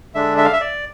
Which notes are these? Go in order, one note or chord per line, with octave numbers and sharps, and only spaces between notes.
D3 G#3 D4 E5
E5
F5
E5
D5